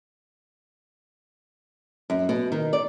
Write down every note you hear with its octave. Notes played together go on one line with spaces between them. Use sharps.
F#2
B2
D#3
D5